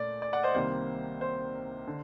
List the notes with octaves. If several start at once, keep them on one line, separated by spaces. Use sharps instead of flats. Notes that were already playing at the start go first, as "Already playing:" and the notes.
Already playing: A#2 A3 D5
D5
D5 F#5
C5 D#5
C2 C3 D#3 G3 A#3 C5
C5
D3